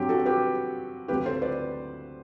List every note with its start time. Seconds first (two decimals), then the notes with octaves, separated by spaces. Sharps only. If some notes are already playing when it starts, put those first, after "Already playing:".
Already playing: G2 F#3 C4 G4
0.09 F#4 A4
0.26 G4 B4
1.08 D2 D3 F#3 C4 G4 B4
1.25 A4 C5
1.42 B4 D5